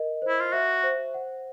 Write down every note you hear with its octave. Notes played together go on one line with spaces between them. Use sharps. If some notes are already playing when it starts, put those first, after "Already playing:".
Already playing: A#4 D#5
C5
E4
F4
F#4 E5
C5
F#5